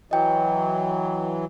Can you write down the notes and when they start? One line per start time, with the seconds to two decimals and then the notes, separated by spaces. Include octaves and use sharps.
0.11 E3 F#3 D#5 G5